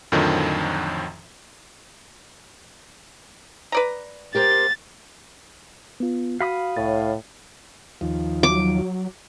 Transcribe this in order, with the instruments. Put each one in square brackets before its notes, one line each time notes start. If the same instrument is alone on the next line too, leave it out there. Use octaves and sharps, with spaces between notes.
[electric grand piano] F2 A2 D3 D#3 F3 F#3
[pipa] B4 D5 A#5
[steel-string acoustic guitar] G4 A#4 C5 [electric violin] A6
[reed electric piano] B3 F4
[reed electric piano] F#4 [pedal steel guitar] F5 B5 D#6
[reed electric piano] C2 C#5 A6 [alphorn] A2
[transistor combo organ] D#2 F3
[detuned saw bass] F#3 [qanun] D6